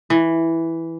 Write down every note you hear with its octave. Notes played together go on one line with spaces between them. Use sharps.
E3